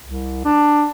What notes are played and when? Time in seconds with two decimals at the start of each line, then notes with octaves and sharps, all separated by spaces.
0.03 C2
0.45 D4